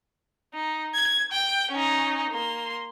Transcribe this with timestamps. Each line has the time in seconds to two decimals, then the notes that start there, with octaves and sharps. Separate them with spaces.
0.54 D#4
0.94 G#6
1.32 G5
1.71 C#4 D#4
2.30 A#3 C6